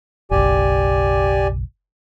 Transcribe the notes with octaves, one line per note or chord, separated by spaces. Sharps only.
F#1 B1 G4 D5 G#5